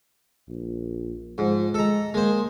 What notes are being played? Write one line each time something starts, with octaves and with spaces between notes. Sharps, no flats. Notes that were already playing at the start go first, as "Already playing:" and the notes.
A#1
G#2 F3
G#3 A4 A#5
G#3 A#3 C5